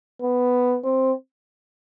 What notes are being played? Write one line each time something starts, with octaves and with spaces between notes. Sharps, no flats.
B3
C4